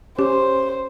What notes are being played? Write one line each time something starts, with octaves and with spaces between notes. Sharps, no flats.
C#4 G4 C5